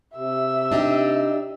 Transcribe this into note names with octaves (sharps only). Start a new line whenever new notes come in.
C3 E5 E6
D4 D#4 G4